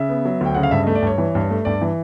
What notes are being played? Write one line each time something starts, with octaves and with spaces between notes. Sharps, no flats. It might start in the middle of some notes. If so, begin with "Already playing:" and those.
Already playing: C#3 E5
B3
F#3
D2 G5
C#3 F#5
F5
G2 E5
A3 D#5
D5
G2 C#5
E3
G2
A3
G2 D5
E3